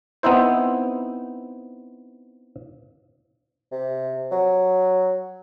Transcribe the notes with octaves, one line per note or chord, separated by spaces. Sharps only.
B3 C4 D#4 E4 C5
C3
F#3